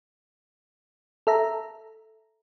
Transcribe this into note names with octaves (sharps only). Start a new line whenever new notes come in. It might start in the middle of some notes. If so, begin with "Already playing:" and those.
A4 E5 A#5